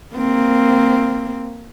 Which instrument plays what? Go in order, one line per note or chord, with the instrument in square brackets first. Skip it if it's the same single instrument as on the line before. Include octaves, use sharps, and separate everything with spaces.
[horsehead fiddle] A#3 C4